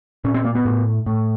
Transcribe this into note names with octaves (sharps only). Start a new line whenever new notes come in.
A#2 C#4
C4
A#3
B3
A2
A2